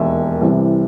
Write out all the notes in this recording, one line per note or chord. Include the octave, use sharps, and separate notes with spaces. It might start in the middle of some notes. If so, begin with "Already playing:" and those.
Already playing: E1 D#2 D#3 E5
C2 C3 E3